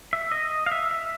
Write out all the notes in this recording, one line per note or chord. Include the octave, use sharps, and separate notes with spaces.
E5
D#5
F5
E5
E5